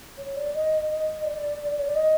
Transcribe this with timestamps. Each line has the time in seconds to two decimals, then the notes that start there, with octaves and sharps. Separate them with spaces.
0.18 C#5
0.36 D5
0.54 D#5
0.89 D#5
1.25 D5
1.79 C#5
1.87 D5
1.95 D#5